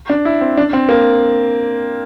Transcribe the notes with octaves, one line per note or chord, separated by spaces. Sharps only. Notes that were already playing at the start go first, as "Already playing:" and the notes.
D4
E4
C4
D4
C4
A#3